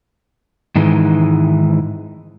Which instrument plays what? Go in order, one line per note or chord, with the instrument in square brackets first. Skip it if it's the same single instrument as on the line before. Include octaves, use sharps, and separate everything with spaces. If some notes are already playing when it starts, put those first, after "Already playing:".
[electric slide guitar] G#2 D#3 E3 G#3